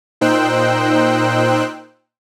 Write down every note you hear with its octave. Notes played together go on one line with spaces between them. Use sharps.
A#2 D#4 C5 G5 E6 F#6